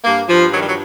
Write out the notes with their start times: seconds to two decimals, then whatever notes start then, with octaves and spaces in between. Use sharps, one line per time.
0.04 G2 A#3
0.28 G2 F3
0.52 D#3 F#3
0.60 G3
0.67 F#3